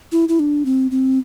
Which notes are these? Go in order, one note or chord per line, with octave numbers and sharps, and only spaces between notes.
E4
E4
D4
C4
C4